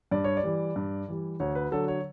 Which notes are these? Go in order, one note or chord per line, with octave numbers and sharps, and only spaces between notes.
G2 D5
C#5
D5
E3 G3
G2
E3 G3
D2 C#5
B4
D3 F#3 A4
C#5